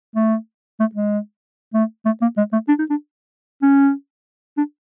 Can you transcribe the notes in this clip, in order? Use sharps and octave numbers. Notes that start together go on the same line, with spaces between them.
A3
A3
G#3
A3
A3
A#3
G#3
A3
D4
D#4
D4
C#4
D4